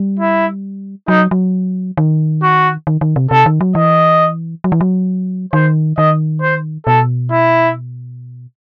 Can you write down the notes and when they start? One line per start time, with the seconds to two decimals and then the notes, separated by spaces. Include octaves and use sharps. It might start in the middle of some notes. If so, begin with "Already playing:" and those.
Already playing: G3
0.20 E4
1.08 F#3 D#4
1.31 F#3
1.97 D#3
2.43 F#4
2.87 D#3
3.01 D#3
3.16 C3
3.31 C3 A4
3.46 D#3
3.61 F#3
3.75 E3 D#5
4.64 F#3
4.72 E3
4.81 F#3
5.53 D#3 C5
5.97 D#3 D#5
6.42 C5
6.87 B2 A4
7.31 E4